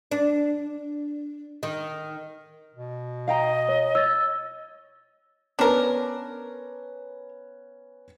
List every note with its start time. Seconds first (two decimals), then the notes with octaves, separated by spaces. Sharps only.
0.11 D4
1.63 D#3
2.75 B2
3.28 D#5 F5 G5 A#5
3.69 C#5
3.95 C#5 E6 A6
5.59 B3 C#4 D4 A#4 B4